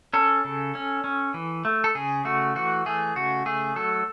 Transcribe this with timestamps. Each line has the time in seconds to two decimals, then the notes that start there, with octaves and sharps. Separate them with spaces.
0.13 C#4 A4
0.44 C#3
0.75 C#4
1.04 C#4
1.34 E3
1.65 A3
1.84 A4
1.95 C#3 G#4
2.25 A3 F#4
2.55 E3 F#4
2.86 A3 G#4
3.16 C#3 F#4
3.46 A3 G#4
3.76 F#3 A4